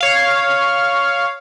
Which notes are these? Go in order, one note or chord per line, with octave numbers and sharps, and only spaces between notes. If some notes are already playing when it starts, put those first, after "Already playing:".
C#5 F5